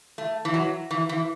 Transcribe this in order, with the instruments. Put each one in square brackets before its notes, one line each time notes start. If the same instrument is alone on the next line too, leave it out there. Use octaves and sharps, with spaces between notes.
[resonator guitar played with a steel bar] A3
E3
F#3
E3
E3